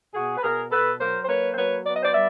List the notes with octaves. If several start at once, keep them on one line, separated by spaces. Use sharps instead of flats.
B2 F#4 G#4
B4
B2 G#4 A#4
B2 A4 B4
F#3 A#4 C5
C5
A#3 B4 C#5
C5
F#3 B4 C#5
B3 D5
D#5
C5 D5
G3 D5 E5